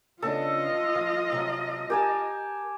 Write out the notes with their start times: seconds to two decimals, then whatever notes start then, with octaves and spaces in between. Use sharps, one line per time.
0.22 C#3 B3 D4 F4 A4 D#5
0.95 F3
1.32 C3 F#3
1.90 G4 A#4 G#5 A5